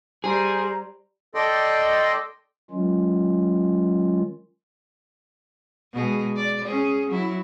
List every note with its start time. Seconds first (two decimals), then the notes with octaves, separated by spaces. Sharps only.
0.24 G3 G#4 C5 A#5
1.35 A4 D5 D#5 G5 C6
2.71 D#3 F#3 G#3 C#4 F4
5.93 B2 G#3 G#4
6.36 D5
6.65 C#4 G#4
7.10 F#3 E4